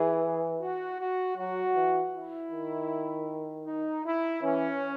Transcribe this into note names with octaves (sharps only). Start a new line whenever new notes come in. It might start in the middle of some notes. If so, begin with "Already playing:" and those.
Already playing: E3 G#4
F#4
F#4
F#3 F#4
E3
E4
D#3
D#4
E4
E3 C#4